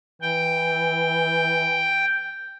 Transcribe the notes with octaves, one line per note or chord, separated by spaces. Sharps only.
E3 G5